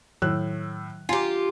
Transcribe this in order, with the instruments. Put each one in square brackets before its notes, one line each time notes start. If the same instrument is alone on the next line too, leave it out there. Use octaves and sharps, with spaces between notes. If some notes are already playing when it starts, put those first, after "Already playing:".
[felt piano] A2 E6 F#6 [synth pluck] D#3 F#3
[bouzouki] F4 G4 [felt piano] G#5 A#5